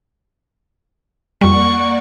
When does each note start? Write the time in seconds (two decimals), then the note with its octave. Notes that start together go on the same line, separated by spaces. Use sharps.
1.41 F2 G3 A#3 D5 F#5 C#6